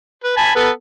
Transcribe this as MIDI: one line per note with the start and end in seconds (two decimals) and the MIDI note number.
0.24 0.34 71
0.37 0.51 80
0.37 0.51 81
0.37 0.51 83
0.56 0.70 59
0.56 0.70 69
0.56 0.70 71